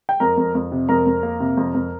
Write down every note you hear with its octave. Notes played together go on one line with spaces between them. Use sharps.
G5
F2 A#4 A#5
F2
F2
C3
F2 A#4 A#5
F2
A#3
C3
F2
F2